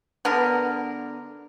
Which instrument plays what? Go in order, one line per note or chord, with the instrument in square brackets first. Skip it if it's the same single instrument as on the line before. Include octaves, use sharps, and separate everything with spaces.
[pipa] D3 B3 A#4